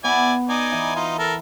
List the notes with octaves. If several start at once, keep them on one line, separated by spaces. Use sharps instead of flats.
B3 E4 D5 G#5
D#4 D5 G#5
E3
D#4 F4
A4 A#4